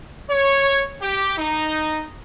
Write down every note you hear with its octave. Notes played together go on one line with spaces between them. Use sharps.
C#5
G4
D#4